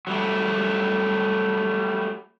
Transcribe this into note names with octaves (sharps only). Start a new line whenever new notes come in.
F#3 G3 A3